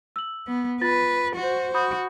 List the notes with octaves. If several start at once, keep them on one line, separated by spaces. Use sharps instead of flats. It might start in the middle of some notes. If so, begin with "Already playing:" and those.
E6 F#7
B3
F4 B4 A6
F#4 C5
F#4 B5 D#6 G6